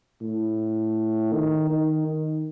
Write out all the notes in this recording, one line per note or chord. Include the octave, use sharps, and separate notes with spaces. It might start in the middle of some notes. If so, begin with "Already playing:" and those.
A2
D#3
D#3
D#3